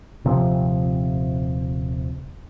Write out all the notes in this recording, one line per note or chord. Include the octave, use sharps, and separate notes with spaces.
D#1 C3 F3 C4